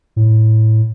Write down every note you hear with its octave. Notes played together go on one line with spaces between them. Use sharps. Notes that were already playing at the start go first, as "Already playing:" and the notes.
A2